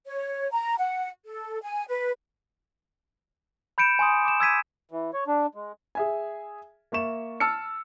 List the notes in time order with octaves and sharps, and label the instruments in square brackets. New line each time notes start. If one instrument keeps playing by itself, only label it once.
[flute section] C#5
A#5
F#5
A4
G#5
B4
[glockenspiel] B5 G6 C#7 D7 E7
G#5 C6 D#6
D6 E7
E6 G#6 B6 D#7
[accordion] E3
C#5
D4
G#3
[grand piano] G#4 E5 G#5
A#3 E5 C#6 E7
A5 E6 F6 C#7